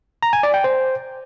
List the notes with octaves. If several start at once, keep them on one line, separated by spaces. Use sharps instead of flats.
A#5
G#5
D5
G5
C5